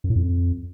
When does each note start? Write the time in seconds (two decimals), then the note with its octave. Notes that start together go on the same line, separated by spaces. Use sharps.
0.04 F#2
0.10 A2
0.16 F2